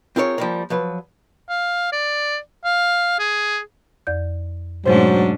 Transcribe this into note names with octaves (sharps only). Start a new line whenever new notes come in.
C4 F4 G#4 A#4 B4 C#5
F3 G3 A#3
F3 F#3 B4
F5
D5
F5
G#4
F2 D5 G6
G#2 B2 F#3 A3 C#4 D4 C5